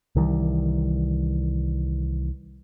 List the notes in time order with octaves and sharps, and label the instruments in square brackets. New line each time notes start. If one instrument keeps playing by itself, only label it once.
[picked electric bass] C2 D#3 E3 G3